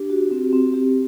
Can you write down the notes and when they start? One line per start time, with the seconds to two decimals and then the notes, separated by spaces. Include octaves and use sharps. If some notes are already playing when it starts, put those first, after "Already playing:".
Already playing: D4 G4
0.10 F#4
0.31 C4
0.53 C4
0.73 C4 G4